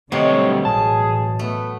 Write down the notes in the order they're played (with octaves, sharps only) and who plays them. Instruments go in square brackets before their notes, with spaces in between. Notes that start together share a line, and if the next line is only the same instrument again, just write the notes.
[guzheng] B2 F#3 [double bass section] D3 G3 [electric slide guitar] A3 C4 G4 [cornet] C#5
[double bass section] A1 [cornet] G#4 [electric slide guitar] A5
[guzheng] A3 [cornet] B3